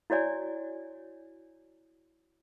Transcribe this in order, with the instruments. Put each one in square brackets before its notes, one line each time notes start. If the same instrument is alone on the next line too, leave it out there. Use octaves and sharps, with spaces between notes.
[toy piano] E4 F#4 C#5 D5 G#5